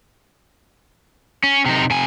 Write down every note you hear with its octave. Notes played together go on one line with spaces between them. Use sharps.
C#4
C3 D#4
C3 G#5